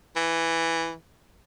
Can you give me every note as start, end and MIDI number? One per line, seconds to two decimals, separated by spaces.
0.16 0.94 52